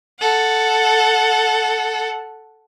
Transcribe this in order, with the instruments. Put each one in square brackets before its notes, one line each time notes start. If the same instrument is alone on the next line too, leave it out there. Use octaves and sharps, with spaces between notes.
[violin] A4 F#5